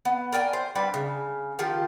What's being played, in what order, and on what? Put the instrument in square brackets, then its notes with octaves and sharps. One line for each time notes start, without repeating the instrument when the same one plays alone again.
[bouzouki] B3
A#4 D5 G5 G#5
C5
G3 D4 B4
C#3
D#3 F3 F4 G4